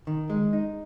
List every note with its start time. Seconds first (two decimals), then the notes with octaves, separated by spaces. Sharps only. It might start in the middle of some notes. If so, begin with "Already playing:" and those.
0.07 D#3
0.30 G#3
0.53 D#4